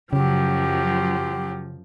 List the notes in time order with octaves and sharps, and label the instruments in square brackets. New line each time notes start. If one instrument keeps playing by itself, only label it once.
[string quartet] F#2 F3 [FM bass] C#3 [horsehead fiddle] F#3 G4